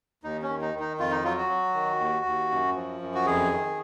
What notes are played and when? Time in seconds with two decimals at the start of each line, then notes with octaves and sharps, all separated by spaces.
0.24 D#2 D#4
0.42 C#4
0.49 D#3
0.61 D#4
0.74 D#3
0.80 D#4
0.99 F2 F4
1.11 D#4
1.24 F#3 F4
1.38 F#4
1.50 F#3
1.74 D#3
1.99 D#2
2.25 D#2
2.51 F#2
2.76 F3
3.01 F#2
3.15 F#4
3.26 F2 G#4
3.52 D#3